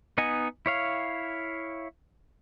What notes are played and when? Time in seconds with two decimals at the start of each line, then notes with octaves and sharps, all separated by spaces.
0.18 B3 D#4 D#5 F#5 G#5
0.66 E4 C#5 F5